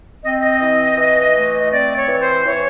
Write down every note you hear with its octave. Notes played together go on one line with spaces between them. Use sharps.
C4 D#5
D#5
E3
E3
A3
D#5
C4 D5
C#5
E3
C5
E3 C#5